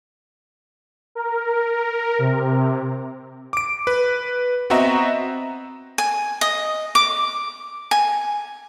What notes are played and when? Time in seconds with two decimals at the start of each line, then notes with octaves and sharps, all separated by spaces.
1.15 A#4
2.19 C3
3.53 D6 D7
3.87 B4
4.70 B3 C4 F#4 D#5 E5 A#5
5.98 G#5
6.41 D#5
6.95 D6
7.91 G#5